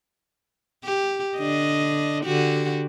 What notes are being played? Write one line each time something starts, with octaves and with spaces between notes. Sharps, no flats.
G4
D3 D4 D#5
D3 F#4 G4